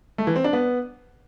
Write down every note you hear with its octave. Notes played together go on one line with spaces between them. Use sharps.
A3
E3
C4
D4
B3